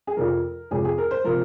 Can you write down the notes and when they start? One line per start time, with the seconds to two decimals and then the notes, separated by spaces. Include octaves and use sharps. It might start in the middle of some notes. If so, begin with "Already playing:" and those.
0.07 G#4
0.17 F2 C3 F3 A#4
0.71 F2 C3 F3 G#4
0.85 G#4
0.98 A#4
1.11 C5
1.24 C3 F3 A#4